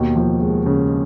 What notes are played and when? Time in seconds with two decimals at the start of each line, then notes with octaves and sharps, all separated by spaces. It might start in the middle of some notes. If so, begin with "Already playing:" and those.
Already playing: D#2 B2
0.16 F3
0.41 G#3
0.66 C#3